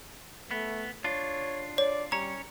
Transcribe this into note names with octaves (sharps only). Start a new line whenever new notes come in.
A3 B3
D4 F4 C#5
C#5 D5
G3 C#4 C#5 A#5